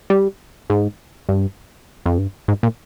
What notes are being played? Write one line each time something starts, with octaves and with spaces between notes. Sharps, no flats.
G3
G#2
G2
F2
G2
G#2
A#2